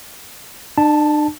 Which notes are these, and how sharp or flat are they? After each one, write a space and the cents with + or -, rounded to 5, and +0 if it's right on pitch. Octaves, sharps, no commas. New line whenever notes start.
D4 +45 A5 +0